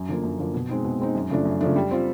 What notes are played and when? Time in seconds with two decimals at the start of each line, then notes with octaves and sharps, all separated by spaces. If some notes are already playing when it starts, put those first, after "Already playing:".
Already playing: F#2
0.09 D3 F3 A#3
0.24 F#2
0.39 D3 F3 A#3
0.54 B2
0.69 G#3 C4 D#4
0.84 B2
1.00 G#3 C4 D#4
1.15 F#2
1.30 C#3 F3 A3 D4
1.45 F#2
1.61 C#3 F3 A3 D4
1.76 G3
1.91 C4 F4